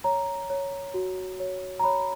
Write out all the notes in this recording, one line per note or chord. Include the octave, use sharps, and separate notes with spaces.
C#5 A#5
C#5
F#4
C#5
A#5
C#5 B5